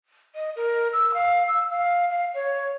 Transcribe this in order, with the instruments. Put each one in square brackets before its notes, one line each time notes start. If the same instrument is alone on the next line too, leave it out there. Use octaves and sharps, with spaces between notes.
[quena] D#5
A#4
E6
F5
E6
F5
F5
C#5